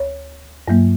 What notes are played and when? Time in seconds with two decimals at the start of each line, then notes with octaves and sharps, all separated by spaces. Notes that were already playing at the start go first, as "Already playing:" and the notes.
Already playing: D2 C#5
0.68 G2 F#3 A#3